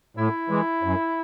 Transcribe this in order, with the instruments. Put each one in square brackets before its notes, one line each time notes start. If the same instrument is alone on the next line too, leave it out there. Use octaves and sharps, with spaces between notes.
[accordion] A2 [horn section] E4
[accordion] E3 G#3
F#2